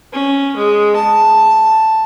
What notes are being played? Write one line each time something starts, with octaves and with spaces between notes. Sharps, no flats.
C#4
G#3
A5